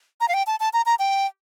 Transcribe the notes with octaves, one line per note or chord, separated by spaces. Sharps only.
A#5
F5
G5
A5
A5
A#5
A#5
G5